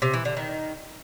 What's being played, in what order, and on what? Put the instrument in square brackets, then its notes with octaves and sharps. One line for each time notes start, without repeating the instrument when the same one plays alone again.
[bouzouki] C3
E3
D3
D#3